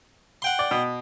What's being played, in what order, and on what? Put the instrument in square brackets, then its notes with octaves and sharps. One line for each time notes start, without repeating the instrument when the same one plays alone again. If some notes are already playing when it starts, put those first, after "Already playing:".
[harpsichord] F#5 G5 C6
[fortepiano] D5
B2